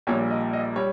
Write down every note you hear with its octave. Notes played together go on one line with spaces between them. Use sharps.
A#1 A#2 G3 C#5
D#5
D#5
G3 C#5